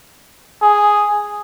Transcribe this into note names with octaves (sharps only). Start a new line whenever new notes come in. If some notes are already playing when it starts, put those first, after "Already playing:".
G#4